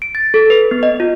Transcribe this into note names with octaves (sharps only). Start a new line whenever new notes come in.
D7
A6
A4
B4
B3
D#5
F4